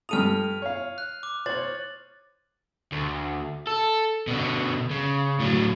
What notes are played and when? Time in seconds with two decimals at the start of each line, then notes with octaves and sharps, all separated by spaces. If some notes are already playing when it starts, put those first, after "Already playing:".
0.09 G2 A4 D#6 F6 D#7 F7
0.62 C#5 F5
0.98 F#6
1.23 D6
1.46 C5 C#5 A6 F#7
2.92 D2
3.67 A4
4.27 B2 D3
4.91 C#3
5.40 A2 F#3